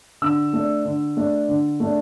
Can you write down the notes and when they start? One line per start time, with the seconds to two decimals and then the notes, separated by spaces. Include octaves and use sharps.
0.22 D3 E6
0.53 A3 D4
0.85 D3
1.17 A3 D4
1.48 D3
1.80 A3 D4